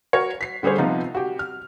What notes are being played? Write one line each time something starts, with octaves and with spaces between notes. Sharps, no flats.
F#4 A#4 C#5
B6 C7
D3 G3 G#4 C5 C#5
C3 F3 B3 D#4 F4
F#4 G4
F6